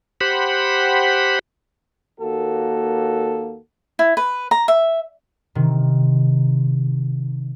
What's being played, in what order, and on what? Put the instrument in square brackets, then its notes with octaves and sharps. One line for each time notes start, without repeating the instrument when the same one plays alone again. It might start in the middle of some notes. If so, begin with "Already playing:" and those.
[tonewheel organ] G4 C5 F#5 B5
[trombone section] D#2 A#3 F#4 A4
[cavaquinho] E4
B4
A#5
E5
[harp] C3 D#3